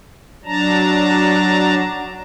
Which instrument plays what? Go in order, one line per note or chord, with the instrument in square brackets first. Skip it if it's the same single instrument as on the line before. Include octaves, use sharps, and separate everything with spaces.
[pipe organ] F#3 D4 A5 A#5